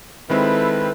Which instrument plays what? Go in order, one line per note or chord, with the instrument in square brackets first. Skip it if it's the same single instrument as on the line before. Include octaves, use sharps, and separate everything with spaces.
[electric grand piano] D#3 G#3 C4 [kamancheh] E4 A4 [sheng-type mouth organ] B4